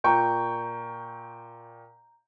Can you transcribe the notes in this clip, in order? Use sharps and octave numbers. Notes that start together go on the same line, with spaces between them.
A#2 G5 A#5 C#6 G6